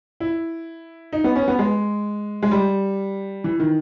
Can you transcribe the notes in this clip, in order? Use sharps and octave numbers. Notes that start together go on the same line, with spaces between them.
E4
D#4
B3
C#4
B3
G#3
G#3
G3
E3
D#3